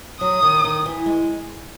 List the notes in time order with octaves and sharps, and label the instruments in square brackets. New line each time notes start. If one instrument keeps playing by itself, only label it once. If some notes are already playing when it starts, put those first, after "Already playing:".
[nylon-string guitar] F#3 [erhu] D#6
[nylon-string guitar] D#3
D#3
E3
G#3